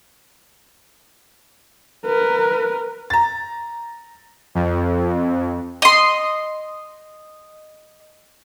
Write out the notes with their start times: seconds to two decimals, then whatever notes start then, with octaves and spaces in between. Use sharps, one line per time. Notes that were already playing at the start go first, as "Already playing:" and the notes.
2.06 A#4 B4
3.10 A#5 A6
4.55 F2
5.82 D#5 C6